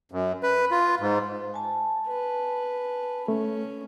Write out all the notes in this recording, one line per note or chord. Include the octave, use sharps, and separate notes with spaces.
F#2
B4
F4
G#2
G#5 A5
B4
A3 C#4